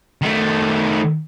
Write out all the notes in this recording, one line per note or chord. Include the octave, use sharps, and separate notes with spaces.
D#3 A3